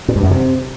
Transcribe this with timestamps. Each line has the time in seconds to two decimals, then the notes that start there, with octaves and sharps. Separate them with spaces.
0.08 A#2
0.16 G2
0.23 F#2
0.31 C3